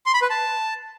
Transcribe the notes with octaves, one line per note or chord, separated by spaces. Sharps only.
C6
B5
B4
A5